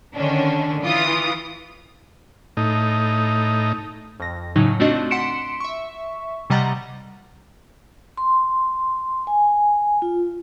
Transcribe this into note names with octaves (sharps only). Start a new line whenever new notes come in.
D3 D#3 C#4 D4
E3 F4 D#6
A2 D#4
F2 A#6
A2 C#3 F#3 D#4
A3 C4 D4 F4 F#4 D#5
F#5 C6 B6 C#7 D7 E7
E5 C#6
C3 G3 D#5 F#5 A#5 A6
C6
G#5
F4